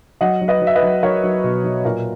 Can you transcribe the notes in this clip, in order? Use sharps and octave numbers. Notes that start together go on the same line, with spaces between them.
F#3 D#5 F#5
F#3
B4 D#5
F#3
E5
B4 D#5
F#3
F#3 A#4 C#5
F#3
B2
F#3
A#2 A#4